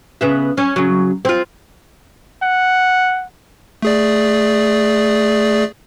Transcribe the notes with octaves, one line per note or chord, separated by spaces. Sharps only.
C#3 B3 E5
C#4
C#3 F#3
C4 F4
F#5
A3 G#4 D5